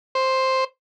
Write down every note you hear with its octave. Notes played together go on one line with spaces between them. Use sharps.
C5